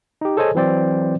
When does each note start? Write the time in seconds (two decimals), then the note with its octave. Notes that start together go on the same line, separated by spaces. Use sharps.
0.21 D#4 G4
0.37 G#4 A4 C5 C#5 D#5 G#5
0.55 E3 F#3 C4 C5 D5